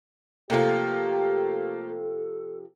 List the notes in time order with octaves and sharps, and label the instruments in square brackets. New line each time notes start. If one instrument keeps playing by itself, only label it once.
[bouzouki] C3 F3 [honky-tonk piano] A3 A#3 F4 [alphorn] G4 [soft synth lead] A4